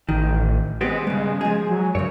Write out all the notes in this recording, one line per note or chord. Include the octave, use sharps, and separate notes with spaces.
A1 D#3
G#3 B3 C4 G4
G2 C#3 G#3
F3 G#4
F#3
F#2 C#3 C#5